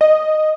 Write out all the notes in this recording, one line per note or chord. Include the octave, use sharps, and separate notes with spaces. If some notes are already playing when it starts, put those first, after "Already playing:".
D#5